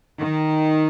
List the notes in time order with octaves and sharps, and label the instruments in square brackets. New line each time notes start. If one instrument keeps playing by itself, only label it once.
[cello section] D#3